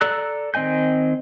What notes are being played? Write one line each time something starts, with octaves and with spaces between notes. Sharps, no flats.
A4 D5 A#5 E6 F#6
D#3 C4 D#5 G#5 G6